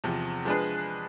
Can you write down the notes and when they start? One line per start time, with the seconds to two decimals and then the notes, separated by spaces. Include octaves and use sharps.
0.04 E2 C3 F3
0.45 F3 G#3 D4 G#4 B4